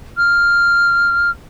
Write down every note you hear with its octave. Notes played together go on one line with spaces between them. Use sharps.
F6